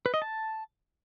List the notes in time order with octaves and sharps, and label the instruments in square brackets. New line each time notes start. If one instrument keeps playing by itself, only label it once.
[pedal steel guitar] B4
D#5
A5